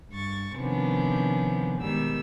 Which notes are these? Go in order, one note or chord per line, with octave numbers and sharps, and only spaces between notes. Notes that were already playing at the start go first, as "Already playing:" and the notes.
G2 C#6 A6
C3 D#3 F3 B3 C#4 D4
G#2 B2 D#3 G3 E6